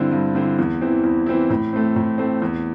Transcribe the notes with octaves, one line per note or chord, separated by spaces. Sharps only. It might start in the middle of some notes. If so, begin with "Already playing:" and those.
Already playing: G2 D3 C4 E4
G2
D3 C4 E4
E2
E3 C4 E4
E2
E3 C4 E4
A2
A3 C4
A2
A3 C4
E2